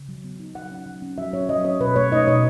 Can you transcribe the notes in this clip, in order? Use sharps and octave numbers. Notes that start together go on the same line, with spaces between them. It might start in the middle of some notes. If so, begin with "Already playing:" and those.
Already playing: C#3
F#3
B3
D#4
F#3 F#5
C#4
F#3
C#4
F#3 E5
C#4 C#5
F#3 D#5
C#4 C#5
B2 B4
A3 C#5
D#4 D#5
B2 C#5